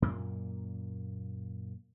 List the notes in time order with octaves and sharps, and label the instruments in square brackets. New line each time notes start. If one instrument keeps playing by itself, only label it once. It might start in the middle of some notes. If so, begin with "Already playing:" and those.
[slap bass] F#2 A#2 A#3